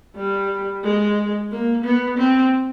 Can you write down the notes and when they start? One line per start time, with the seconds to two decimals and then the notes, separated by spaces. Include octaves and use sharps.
0.16 G3
0.83 G#3
1.52 A#3
1.84 B3
2.18 C4